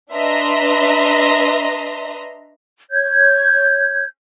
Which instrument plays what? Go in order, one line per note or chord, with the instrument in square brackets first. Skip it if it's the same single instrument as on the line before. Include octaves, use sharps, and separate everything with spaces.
[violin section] D4 B4 D#5 E5 A#5 C6
[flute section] C#5 G6 G#6